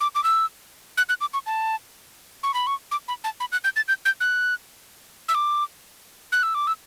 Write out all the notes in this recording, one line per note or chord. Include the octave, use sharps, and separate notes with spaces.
D6
D6
E6
F#6
F#6
D6
C#6
A5
C#6
B5
C#6
D6
B5
A5
B5
F#6
G6
A6
G6
G6
F#6
E6
D6
F#6
E6
D6
E6